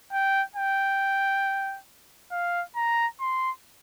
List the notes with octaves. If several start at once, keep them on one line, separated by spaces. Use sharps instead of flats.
G5
G5
F5
A#5
C6